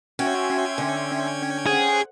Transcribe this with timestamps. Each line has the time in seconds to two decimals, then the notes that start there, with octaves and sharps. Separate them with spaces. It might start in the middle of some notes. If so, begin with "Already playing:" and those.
0.19 C#4 F#4 E5 G5 G#5 C6 G#6
0.78 D3
1.66 G#4 C5 F#5